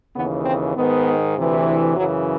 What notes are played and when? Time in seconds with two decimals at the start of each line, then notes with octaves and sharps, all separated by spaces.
0.15 D#2 C#3 E3 B3
0.45 C4
0.76 G#2 D#3 B3
1.37 D2 C3 E3
1.96 F#2 C#3 E3 F#3